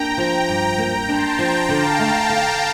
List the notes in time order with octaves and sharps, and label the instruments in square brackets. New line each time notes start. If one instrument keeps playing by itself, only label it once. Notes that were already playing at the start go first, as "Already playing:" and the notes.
Already playing: [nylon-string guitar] A#3 D4 [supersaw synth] G5 A#5
[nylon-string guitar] F3
G2
[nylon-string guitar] A#3 [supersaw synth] G5 A#5
[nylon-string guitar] D4 [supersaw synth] A5 C6
[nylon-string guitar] F3 [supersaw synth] G5 A#5
[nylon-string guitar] D3 [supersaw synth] F5 A5
[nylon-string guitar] A3 [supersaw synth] F5 A5
[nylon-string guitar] D3